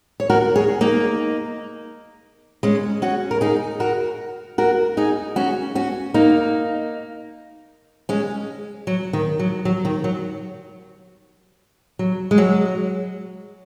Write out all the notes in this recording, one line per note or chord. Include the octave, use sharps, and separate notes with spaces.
C#5
F#4 A#4
G#4 C#5
A#3 D#4
G#3 C#4
C#4 F#4
A#4
D#4 G#4
F#4 A#4
F#4 A#4
D#4 G#4
C#4 F#4
C#4 F#4
A#3 D#4
G#3 C#4
F#3
D#3
F#3
F#3
D#3
F#3
F#3
G#3
F#3